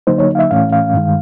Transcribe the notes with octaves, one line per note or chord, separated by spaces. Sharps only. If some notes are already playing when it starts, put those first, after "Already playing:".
D3 F#3 A#3 D#4 C5
C#5
F5
E5
A2 E3 A3 C#4 F5
F5
G2 D#3 G#3